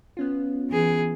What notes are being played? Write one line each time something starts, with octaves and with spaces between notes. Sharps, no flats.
B3 C#4 F4
E3 G#4